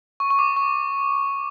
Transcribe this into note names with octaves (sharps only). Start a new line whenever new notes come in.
C#6
C#6
D6
C#6